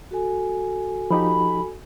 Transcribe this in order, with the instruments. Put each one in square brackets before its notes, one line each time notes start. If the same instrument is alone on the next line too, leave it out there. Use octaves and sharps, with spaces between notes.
[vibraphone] F#4 A4 G#5
[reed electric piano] F3 D#4 G4 [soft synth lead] B5